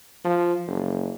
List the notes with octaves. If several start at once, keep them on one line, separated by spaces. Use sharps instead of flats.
F3
F#1